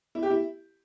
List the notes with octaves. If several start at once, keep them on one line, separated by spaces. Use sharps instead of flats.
E4
G4
E4